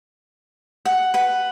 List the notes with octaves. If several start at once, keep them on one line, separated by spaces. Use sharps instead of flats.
F#5
B4 F#5